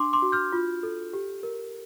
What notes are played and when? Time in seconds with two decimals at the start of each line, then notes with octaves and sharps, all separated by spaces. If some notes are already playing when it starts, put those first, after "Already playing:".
Already playing: D4 C6 D6
0.13 C6 D6
0.22 F#4
0.32 F6 G6
0.53 F4
0.83 A4
1.13 G4
1.43 A#4